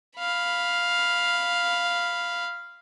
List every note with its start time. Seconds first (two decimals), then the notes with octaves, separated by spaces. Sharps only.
0.18 F5 B5